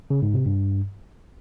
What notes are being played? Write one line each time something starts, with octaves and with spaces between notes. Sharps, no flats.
C#3
G#2
C3
G2